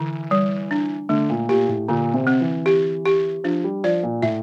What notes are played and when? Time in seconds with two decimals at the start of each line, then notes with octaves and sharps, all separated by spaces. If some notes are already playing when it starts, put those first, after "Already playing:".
Already playing: D3 E3
0.31 G3
0.71 D4
1.09 D3 A3
1.29 A#2
1.49 A#2 G4
1.68 A2
1.88 A#2 D3
2.14 C3
2.27 C4
2.41 E3
2.66 G4
3.05 G4
3.44 F3 D4
3.64 G3
3.84 F3 D5
4.03 A#2
4.22 A2 E5